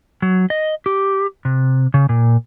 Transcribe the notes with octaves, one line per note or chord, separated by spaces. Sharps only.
F#3
D#5
G4
C3
C#3
A#2